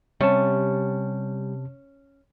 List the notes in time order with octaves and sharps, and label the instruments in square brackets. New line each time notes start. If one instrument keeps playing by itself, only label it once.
[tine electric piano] C3 A5 [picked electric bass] G3 [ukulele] C#4